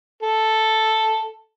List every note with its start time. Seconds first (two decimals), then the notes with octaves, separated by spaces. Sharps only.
0.22 A4